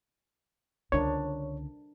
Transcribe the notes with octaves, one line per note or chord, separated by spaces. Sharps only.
C#2 D3 D4 A#4 C5 C#5